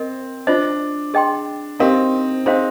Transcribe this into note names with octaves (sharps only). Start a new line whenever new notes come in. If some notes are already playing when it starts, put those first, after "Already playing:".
Already playing: C4 A#4 D#5
D4 F4 C5 D#5
G#4 D#5 G5 C6
C4 D#4 G4 A#4 F5
C4 D#4 G#4 C5 F5